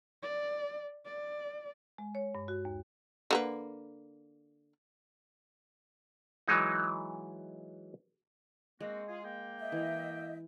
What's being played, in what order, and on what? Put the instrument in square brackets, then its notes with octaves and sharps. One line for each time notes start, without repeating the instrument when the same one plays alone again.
[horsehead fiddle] D5
D5
[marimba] G#3
C#5
G2
F#4
D#2
[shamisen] D3 A#3 B4
[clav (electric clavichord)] E3 F#3 G#3 D#4
[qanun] G#3 [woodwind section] A#3 C4 F#4
[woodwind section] F4 G#4
A#3 G5
[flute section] D#5 E5
[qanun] E3